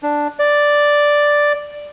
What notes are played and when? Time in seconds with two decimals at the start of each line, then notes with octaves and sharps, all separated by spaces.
0.03 D4
0.39 D5